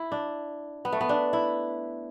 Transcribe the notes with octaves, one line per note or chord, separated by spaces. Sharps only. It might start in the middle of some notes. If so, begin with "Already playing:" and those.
Already playing: E4
D4
B3
A3
B3
D4
E4